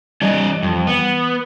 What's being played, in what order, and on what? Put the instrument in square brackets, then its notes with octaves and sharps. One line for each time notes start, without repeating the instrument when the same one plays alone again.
[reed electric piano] E3 G3 [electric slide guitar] C#4 D5 D#5
[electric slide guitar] F2
B3